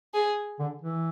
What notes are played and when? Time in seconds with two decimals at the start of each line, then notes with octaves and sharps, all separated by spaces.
0.14 G#4
0.59 D3
0.82 E3